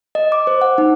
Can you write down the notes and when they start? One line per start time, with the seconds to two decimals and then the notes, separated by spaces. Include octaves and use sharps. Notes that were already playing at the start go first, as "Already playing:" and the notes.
0.15 D#5
0.32 D6
0.47 C5
0.61 F#5
0.78 D#4